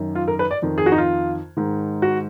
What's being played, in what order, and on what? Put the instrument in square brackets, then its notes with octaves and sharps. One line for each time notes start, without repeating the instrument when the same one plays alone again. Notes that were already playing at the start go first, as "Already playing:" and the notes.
Already playing: [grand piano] F#2 D#3
F4
A#4
B4
D5
F2 D#3
G#4
F#4
D#4
F4
G#2 D#3
F#4